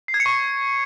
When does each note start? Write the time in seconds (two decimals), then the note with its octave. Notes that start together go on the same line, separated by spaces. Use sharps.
0.08 C7
0.14 G#6
0.20 C#7
0.26 C#6